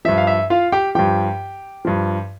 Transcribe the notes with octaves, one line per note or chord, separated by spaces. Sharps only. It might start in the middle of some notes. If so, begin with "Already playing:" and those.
G2 F3 E5
F5
E5
F4 F5
G4 G5
G2 F3 G4 G5
G2 F3